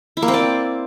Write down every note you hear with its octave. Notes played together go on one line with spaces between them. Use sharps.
E4
A#3
C4
D5